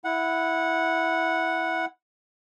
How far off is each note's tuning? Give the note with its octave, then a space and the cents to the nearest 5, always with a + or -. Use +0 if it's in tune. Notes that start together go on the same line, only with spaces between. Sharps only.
E4 +0 F#5 -10